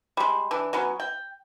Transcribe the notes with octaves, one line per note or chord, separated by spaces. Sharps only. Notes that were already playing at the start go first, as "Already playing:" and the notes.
G3 G#3
E3 D4
F#3 B3 C#4
G5